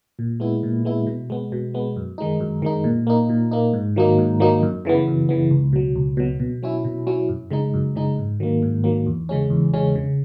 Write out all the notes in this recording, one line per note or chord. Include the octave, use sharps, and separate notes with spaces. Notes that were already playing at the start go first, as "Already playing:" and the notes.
A#2
G#3 B3 E4
A#2
G#3 B3 E4
B2
G#3 B3
B2
G#3 B3
F#2
D#3 G#3 D#4
F#2
D#3 G#3 D#4
A#2
A#3 D#4
A#2
A#3 D#4
G#2
D#3 F#3 A#3 D#4
G#2
D#3 F#3 A#3 D#4
F#2
C#3 E3 B3
F#2
C#3 E3 B3
C#2
B2 F#3
C#2
B2 F#3
B2
F#3 C#4 E4
B2
F#3 C#4 E4
F#2
C#3 G#3 D#4
F#2
C#3 G#3 D#4
G#2
D#3 F#3 A#3
G#2
D#3 F#3 A#3
E2
C#3 G#3 C#4
E2
C#3 G#3 C#4
C#3